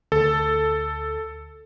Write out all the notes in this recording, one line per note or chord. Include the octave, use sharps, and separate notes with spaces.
D2 A4